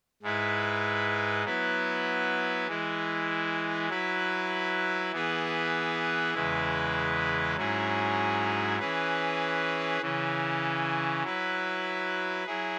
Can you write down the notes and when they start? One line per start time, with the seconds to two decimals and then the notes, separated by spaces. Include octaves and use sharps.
0.22 G#2 G#3 E4 B4
1.45 F#3 B3 E4 B4
2.67 E3 G#3 E4
3.89 F#3 E4 B4
5.12 E3 B3 G#4 B4
6.34 E2 C#3 G#3 E4 B4
7.57 G#2 F#3 C#4 E4 G#4
8.79 E3 C#4 G#4 B4
10.01 C#3 E3 C#4
11.23 F#3 E4 B4
12.46 F#3 E4 G#4